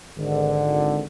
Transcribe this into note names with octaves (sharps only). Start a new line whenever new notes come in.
G#1 D3